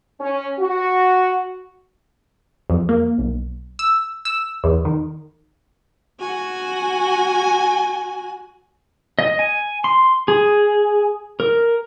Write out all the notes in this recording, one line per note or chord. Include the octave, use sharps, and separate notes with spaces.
C#4
F#4
F2
A#3
B1
E6
E6
E2
D#3
F#4 G#5
D#5
G#5
C6
G#4
A#4